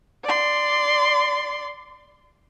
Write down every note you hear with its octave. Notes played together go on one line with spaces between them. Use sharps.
D5 C6